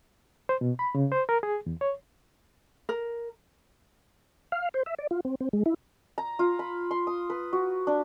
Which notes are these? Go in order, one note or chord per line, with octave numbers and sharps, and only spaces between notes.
C5
B2
B5
C#3
C5
A#4
G#4
E2
C#5
A#4
F5
C5
E5
D5
F4
C4
C4
G#3
E4
A#5
F4
B5
C6
D#6
B4
F#4
D4